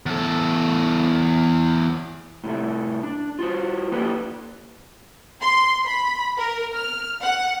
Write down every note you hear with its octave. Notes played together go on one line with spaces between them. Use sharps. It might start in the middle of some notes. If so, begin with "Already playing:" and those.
E2 A4
A2 C3 A3
D4
F4 F#4 C5
A#3 D#4 G4 A4 B4
C6
B5
A#4
F6
F#5